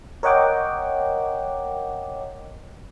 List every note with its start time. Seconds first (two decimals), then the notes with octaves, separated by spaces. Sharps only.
0.23 A#4 C#5 D#5 F#5 G5 D6